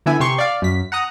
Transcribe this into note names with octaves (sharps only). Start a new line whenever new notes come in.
D3 B3 E4 E5 G#5
C3 G4 C6 C#6
D5 F5
F#2 B6
F#5 A#5 D#6 F#6